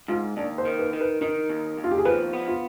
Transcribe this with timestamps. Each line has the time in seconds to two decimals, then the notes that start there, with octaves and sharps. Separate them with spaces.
0.08 G#2 F4
0.37 D#2 D4
0.58 C5
0.65 D#3
0.79 B4
0.93 D#3
1.01 B4
1.21 D#3 D#4
1.49 D#2
1.77 D#2
1.84 F4
1.91 G4
1.98 G#4
2.05 F3 B4
2.33 B3
2.48 F4